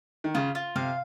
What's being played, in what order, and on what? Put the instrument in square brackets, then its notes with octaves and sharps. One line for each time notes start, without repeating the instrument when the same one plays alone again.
[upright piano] D#3
[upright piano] C#3 [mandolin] F4
[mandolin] F4
[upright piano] C3 [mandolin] F5